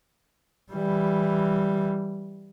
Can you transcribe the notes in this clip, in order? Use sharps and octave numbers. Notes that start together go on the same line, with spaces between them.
E3 G3